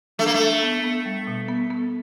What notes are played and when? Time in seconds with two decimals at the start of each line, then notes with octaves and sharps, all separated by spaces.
0.19 A3 D4
0.26 A#3
0.34 A3
0.40 D4
0.63 B3
0.84 B3
1.05 G3
1.27 B2
1.48 B3
1.71 B3